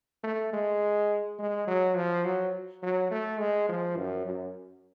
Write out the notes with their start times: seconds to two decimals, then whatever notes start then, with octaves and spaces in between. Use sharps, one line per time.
0.24 A3
0.53 G#3
1.39 G#3
1.68 F#3
1.96 F3
2.25 F#3
2.83 F#3
3.11 A3
3.40 G#3
3.69 F3
3.97 F#2
4.26 F#2